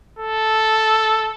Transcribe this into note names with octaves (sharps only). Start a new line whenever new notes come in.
A4